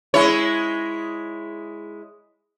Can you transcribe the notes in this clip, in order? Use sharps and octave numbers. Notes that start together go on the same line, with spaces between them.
G#3 E4 C#5